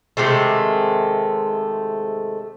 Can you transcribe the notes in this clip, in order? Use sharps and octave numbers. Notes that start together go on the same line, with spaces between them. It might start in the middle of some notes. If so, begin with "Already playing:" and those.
C3 D#3 G#3 A3